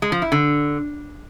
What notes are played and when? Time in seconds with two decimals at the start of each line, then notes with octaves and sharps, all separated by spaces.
0.02 G#3
0.12 F3
0.22 E4
0.32 D3